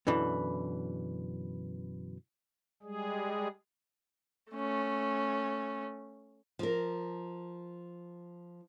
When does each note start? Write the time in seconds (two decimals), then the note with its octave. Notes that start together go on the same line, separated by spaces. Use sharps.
0.07 F#2 B2 D3 E3
2.83 G3 G#3 G#4
4.52 A3 C#4
6.59 F3 A#4